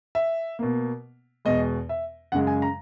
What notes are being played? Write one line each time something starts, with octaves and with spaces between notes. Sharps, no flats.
E5
B2 A#3
E2 B2 G#3 D#5
E5
F#2 C#3 G#3 F#5
G#5
A#5